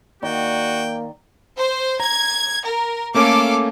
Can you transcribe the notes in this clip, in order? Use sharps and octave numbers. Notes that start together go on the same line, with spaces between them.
D#3 A#3 F#4 D5 G5
C5
A#5 G#6
A#4
A3 A#3 C#4 A4 F5 D6